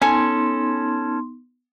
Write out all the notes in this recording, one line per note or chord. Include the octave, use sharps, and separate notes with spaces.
B3 C#4 D#4 A4 G#5 C6